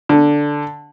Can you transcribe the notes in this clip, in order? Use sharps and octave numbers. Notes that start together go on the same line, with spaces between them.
D3